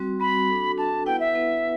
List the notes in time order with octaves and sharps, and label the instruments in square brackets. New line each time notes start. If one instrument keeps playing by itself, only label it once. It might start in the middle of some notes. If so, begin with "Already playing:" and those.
Already playing: [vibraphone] G3 C4 F#4
[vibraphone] G3 C4 F#4 [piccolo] B5
[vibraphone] D4 F#4 A4
[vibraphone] D4 F#4 A4 [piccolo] A5
[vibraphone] B3 E4 B4 F#5 [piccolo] G5
[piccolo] E5
[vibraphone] B3 E4 B4 F#5